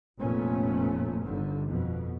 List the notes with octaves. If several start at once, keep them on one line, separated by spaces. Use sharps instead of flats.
F1 F2 A#2 A3 B3 C#4
G1 D3 D#3
F2 B2